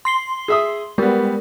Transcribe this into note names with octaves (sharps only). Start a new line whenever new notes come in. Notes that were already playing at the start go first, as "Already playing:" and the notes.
C6 C7 G7
G#4 E5 D#6
G3 G#3 B3 A#4